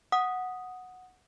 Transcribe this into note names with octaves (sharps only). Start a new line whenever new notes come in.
F#5 D#6